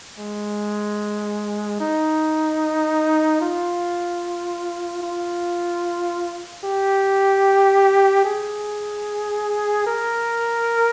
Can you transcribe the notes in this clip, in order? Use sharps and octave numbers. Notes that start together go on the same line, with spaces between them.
G#3
D#4
F4
F4
G4
G#4
A#4